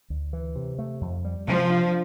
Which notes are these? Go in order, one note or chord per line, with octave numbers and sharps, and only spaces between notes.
D2
E3
C3
A3
F2
G3
C3 F3
D4